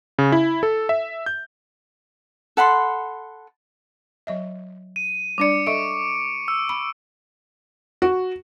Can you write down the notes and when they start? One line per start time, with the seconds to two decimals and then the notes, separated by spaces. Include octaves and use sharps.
0.19 C#3
0.32 E4
0.63 A4
0.89 E5
1.26 G6
2.57 A4 F#5 B5 C6
4.27 F#3 D#5 E5
4.96 D#7
5.38 G3 D4 D5 D6 C#7
5.67 A4 D#5 E5 C#6 D7
6.48 E6
6.69 B5
8.02 F#4